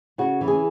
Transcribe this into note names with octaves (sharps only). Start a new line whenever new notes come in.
C#3 F#4
E3
G#4